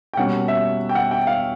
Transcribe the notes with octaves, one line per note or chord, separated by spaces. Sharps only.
G5
B2 G3 A#3 C#4 F#5
E5
G5
F#5
G5
F5